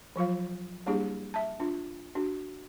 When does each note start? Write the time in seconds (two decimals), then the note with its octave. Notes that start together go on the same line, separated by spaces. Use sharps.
0.16 F3 F#3 F4 F5
0.86 G3 A#3 D4 E4 G4 G#4
1.34 E5 A5
1.60 D4 F4
2.15 D4 F#4